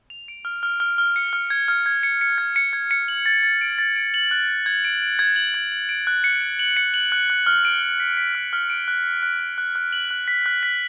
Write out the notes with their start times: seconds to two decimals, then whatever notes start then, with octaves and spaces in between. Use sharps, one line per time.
0.10 F7
0.28 D7
0.45 F6
0.63 F6
0.80 F6
0.98 F6
1.16 C#7
1.33 F6
1.50 G#6
1.68 F6
1.86 G#6
2.03 C#7
2.21 C#7
2.38 G#6
2.56 C#7
2.73 G#6
2.91 C#7
3.08 F#7
3.26 A6
3.43 A6
3.61 D7
3.78 A6
3.96 D7
4.14 F#7
4.31 F#6
4.48 D7
4.66 G#6
4.85 D7
5.02 D7
5.19 G#6
5.36 F#7
5.54 G#6
5.72 F#7
5.89 D7
6.07 F#6
6.24 C#7
6.42 F#7
6.59 F#7
6.77 C#7
6.94 F#7
7.12 F#6
7.30 F#6
7.47 F6
7.65 D7
7.82 F6
8.00 B6
8.17 B6
8.35 F6
8.53 F6
8.70 D7
8.88 F#6
9.05 C#7
9.22 F#6
9.40 F#6
9.58 F#6
9.75 F#6
9.93 F#7
10.11 F#6
10.28 B6
10.46 F#6
10.63 B6